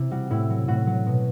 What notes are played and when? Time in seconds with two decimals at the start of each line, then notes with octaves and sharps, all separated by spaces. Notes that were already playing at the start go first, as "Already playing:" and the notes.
Already playing: C3 E4
0.11 G3 F#4
0.30 A2 E4
0.50 F#3
0.68 A2 F#4
0.87 F#3
1.06 B2